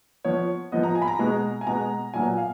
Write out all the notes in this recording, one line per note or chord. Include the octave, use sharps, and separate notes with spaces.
F3 B3 C#5
F3 B3 D#5
A#5
G#5
B5
A#5
B2 G#3 B3
G#5
B2 G#3 B3 A#5
A#2 F#3 B3 G#5
F5